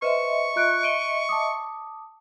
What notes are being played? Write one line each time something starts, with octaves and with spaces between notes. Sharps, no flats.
B4 C5 D#5 E5 C6 C#6
F4 F#6 D7
D7 D#7 G7
A5 D6 D#6